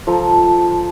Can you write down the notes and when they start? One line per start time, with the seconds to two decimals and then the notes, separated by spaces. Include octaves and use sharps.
0.07 F3 A4 A#5